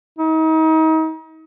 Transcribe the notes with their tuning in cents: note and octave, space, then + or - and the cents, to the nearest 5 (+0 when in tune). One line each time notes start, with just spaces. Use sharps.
D#4 +35